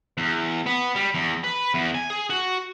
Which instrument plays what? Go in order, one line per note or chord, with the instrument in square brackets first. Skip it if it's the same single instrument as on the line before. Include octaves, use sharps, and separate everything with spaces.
[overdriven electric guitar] E2
B3
G3
E2
B4
E2
G#5
G#4
F#4